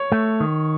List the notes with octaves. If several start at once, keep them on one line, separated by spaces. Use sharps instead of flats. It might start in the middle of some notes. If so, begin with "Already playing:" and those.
Already playing: C#5
A3
D#3